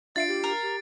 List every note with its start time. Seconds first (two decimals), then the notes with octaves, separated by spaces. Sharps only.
0.16 D4 F4 E5 A6 C7 D7
0.28 G4
0.44 A#4
0.63 G4